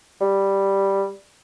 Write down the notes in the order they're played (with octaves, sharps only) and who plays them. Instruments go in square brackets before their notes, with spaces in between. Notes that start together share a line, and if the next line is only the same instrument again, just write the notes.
[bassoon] G3